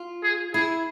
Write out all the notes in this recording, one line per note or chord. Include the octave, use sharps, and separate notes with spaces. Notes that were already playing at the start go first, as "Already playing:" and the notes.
Already playing: F4
G#4
E4 G#4